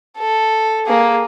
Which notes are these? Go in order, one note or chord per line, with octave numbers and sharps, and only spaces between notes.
A4
A#3 G#4